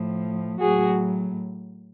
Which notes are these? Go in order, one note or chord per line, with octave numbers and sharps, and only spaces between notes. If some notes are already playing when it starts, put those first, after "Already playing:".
Already playing: A2 F3
A2 F#3 F#4 G#4